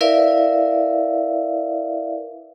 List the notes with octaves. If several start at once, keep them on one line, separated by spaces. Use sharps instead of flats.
E4 A#4 B4 D5 E5 F5